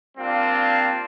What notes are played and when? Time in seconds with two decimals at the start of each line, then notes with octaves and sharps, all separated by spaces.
0.18 G3 A#3 C4 D4 F4 F5